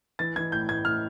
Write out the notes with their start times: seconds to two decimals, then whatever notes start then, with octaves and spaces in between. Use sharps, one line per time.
0.19 E3 A6
0.36 E3 G#6
0.52 A2 G6
0.69 A2 G#6
0.85 A2 F6